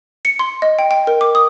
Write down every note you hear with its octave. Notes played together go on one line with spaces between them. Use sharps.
C#7
C6
D#5
G5
G5
A#4
D6
D#6